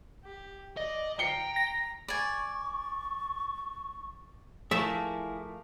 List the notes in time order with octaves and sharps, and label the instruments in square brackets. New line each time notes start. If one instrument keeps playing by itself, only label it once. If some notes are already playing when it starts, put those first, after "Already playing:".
[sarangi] G4
[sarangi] D5 [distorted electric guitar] D#5
[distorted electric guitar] G5 [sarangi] A#5 [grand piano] C7 C#7 G7
[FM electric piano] A#6
[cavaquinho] D5 G#5 [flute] C#6
[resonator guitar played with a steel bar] F3 A3 A#3 [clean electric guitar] E4 G#4 [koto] E5